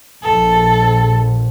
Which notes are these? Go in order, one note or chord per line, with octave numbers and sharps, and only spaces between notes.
A#1 A4